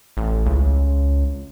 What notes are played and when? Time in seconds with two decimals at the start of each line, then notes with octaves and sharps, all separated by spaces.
0.17 A1
0.46 C#2